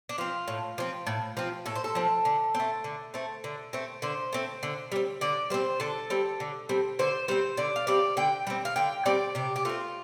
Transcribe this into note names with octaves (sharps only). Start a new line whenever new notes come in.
D4
F3 C4 F4
A2
F3 C4
A2
F3 C4
A2 A4
C5
A4
F3 C4
D3
C4
A3
D3
A3 C4
D3
A3 C4
D3 C5
A3 C4
D3
G3 C4
D3 D5
G3 C4 C5
D3 A4
G3 C4
D3
G3 C4
D3 C5
G3 C4 C5
D3 D5
F5
G3 C4 D5
D3 G5
G3 C4
F5
D3 G5
G3 C4 D5
C3 G4
G4
A3 C4 F4